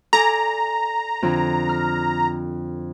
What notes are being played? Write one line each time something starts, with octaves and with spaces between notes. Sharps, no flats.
A4 D5 G#5 A#5
F2 D3
F6